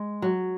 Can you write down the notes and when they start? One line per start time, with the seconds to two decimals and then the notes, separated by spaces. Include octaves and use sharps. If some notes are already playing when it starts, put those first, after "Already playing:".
Already playing: G#3
0.22 F#3